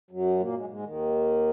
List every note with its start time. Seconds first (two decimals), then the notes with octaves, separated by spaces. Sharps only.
0.11 F#2 F#3
0.39 A#2 A#3
0.55 G#2 G#3
0.68 G#2 G#3
0.84 D#2 D#3